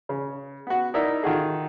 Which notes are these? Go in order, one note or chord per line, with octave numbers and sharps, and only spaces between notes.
C#3
B3 F#4
D#4 E4 A#4 D5 E5
D#3 F4 F#4 G#4 A4